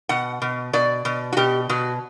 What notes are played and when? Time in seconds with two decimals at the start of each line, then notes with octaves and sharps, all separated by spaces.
0.09 B2 F#5
0.42 B2
0.73 B2 D5
1.05 B2
1.33 F#4
1.37 B2 G4
1.69 B2 F#4